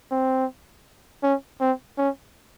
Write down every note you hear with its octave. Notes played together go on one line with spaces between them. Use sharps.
C4
C#4
C4
C#4